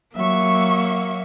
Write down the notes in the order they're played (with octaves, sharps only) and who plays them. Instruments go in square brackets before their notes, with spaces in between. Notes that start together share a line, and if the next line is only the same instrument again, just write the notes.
[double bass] F#3 [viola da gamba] A#3 [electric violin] E5 C#6